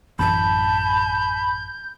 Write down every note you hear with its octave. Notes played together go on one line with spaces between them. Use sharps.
A1 F#2 E3 A5 B5 G6